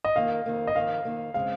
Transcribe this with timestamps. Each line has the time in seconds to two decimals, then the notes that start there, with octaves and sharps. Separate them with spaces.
0.05 D#5
0.16 F2 D#3 A#3 F5
0.46 F2 D#3 A#3
0.67 D#5
0.75 F2 D#3 A#3 F5
1.05 F2 D#3 A#3
1.34 C#3 G#3 C4 F5